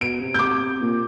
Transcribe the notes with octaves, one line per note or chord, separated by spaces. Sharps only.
B2 D7
C3
D6 G6
A#2